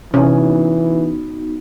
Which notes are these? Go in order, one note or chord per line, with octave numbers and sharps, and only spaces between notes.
C3 E3 B3 C#4 D#4 F#4